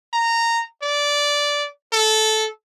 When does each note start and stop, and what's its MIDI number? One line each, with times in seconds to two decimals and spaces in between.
0.13 0.63 82
0.83 1.67 74
1.92 2.47 69